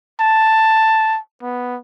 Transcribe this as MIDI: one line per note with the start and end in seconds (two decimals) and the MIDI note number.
0.20 1.18 81
1.42 1.77 59